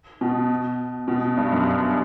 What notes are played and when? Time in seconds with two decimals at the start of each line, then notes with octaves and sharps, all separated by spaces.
0.21 B2
1.08 B2
1.37 G2
1.52 F#2